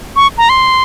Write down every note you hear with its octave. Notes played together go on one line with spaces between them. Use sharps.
C#6
A#5
C6